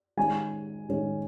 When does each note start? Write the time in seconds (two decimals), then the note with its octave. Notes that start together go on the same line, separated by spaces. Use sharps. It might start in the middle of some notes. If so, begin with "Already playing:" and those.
0.17 D#3 G#3 C#4 G#5
0.89 D#3 G#3 C#4